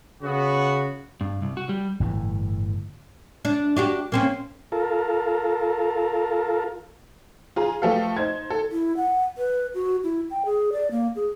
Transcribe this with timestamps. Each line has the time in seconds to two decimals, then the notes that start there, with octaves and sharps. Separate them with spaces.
0.22 C#3 B3 F#4
1.21 G2
1.42 C2
1.57 F#4
1.69 G3
2.00 G1 A2 E3
3.45 D4
3.76 D4 F#4 G4
4.12 A#3 C4 C#4
4.72 F4 A4 A#4
7.56 F4 G#4 A#5
7.82 F3 A3 G4 A4 B4 F5
8.17 D#4 C5 G#6
8.50 A4
8.72 E4
8.97 F#5
9.38 B4
9.74 F#4
10.04 E4
10.31 G5
10.45 G#4
10.72 D5
10.91 A#3
11.16 G#4